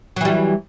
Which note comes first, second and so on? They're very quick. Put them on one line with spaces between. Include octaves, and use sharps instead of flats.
F#3 E3 G3